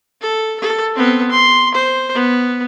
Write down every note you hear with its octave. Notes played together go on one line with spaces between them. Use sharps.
A4
A4
B3 C4
C6
C5
B3